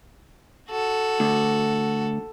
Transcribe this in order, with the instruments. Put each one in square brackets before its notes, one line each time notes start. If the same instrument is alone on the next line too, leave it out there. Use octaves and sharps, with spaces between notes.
[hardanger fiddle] F#4 A4
[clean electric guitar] D2